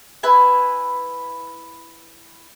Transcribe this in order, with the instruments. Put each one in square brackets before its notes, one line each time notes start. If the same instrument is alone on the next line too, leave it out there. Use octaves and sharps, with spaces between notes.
[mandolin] E4 B4 G#5